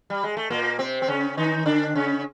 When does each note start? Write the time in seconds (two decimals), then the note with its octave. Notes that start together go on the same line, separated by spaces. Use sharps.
0.10 G3
0.24 G#3
0.37 A3
0.50 A#2 A#3
0.79 C3 C4
1.02 C4
1.08 C#3 C#4
1.37 D#3 D#4
1.66 D3 D4
1.95 C#3 C#4